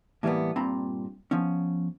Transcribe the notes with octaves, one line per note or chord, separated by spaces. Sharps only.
A2 E3 G3 G#3 A#3 B3
G2 A#2 C4 A#5 B5
F3 B3 C#4